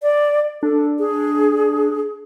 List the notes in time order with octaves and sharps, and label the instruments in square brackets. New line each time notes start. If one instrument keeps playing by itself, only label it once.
[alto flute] D5
[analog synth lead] D4 [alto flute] A4
[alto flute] G#4